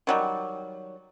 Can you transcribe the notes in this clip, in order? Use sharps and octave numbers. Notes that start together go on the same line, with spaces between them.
D#3 F#3 G3